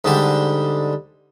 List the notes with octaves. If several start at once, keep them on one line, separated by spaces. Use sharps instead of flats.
G#2 D3 G3